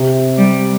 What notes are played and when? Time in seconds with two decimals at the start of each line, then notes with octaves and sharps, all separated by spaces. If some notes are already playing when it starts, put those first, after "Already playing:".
Already playing: C3
0.38 G3